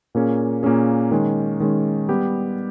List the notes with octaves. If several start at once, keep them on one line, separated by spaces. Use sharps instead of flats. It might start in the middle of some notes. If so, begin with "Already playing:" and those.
A#2 A#3 C#4 G#4
A#2 A#3 C#4 G#4
D#3 G#3 C#4
D#3 G#3 C#4
G3 B3 G4